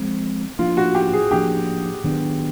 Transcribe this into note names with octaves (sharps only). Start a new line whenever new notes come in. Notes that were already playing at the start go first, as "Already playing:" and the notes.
Already playing: F3 G#3 C4
F3 A#3 D4 F4
F#4
G4
G#4
F3 A#3 D4 G4
D#3 F#3 B3 D4